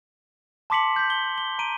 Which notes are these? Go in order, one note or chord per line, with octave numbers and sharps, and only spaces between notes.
A5 C6 D6 B6 C#7 F#7
G6 B6
G7
G7
A#5 D7 D#7